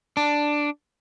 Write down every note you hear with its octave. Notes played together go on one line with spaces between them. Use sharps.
D4